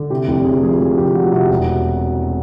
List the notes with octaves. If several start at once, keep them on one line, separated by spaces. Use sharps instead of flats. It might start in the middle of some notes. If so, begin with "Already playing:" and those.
Already playing: D3
C3 G4
F1 G4
F1 G#4
F2 G#4
F2 G#4
F1 G4
F2 F#4
C3 F#4
E1